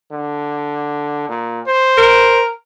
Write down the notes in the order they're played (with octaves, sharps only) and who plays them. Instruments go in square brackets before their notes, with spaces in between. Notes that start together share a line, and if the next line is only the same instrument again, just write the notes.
[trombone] D3
A#2
C5
[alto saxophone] A#4